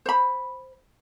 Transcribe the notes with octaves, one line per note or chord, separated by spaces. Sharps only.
C5 B5